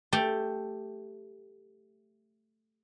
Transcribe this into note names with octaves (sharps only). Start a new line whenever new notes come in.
A3 G4